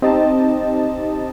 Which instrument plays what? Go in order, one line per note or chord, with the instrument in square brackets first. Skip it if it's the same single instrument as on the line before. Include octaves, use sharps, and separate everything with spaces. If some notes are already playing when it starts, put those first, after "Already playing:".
[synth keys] C4 D#4 G4 D#5 A5